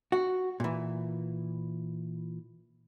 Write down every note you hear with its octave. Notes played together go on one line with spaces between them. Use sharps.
F#4
A#2 E3